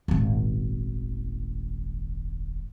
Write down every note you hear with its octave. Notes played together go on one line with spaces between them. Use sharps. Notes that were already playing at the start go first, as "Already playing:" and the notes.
D#1 G#1